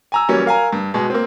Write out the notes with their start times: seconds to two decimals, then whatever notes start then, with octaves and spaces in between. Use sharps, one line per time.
0.12 G#5 A#5 E6
0.28 E3 F#3 G3 A#3 C#4
0.46 A#4 F5 G#5 A#5
0.73 G2
0.94 B2 G#3
1.10 A#3 C4